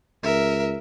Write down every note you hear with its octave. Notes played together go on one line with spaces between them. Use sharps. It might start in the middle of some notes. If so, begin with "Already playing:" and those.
C#2 A#4 E5